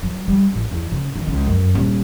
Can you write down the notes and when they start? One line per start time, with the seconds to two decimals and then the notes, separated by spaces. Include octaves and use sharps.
0.03 F#3
0.28 G3
0.54 A1
0.71 E2
0.92 C#3
1.16 D#3
1.27 C#2
1.46 F#2
1.75 D#1